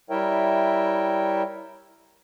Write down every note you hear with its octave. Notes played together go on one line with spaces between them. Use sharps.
G3 E4 A#4 C#5 E5 G5